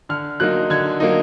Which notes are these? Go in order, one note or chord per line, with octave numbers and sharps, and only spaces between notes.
D3 F6
F#3 A#3 D#4 F#6
D3 G#6
F#3 A#3 D#4